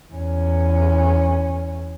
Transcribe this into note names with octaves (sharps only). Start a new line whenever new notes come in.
E2 C#4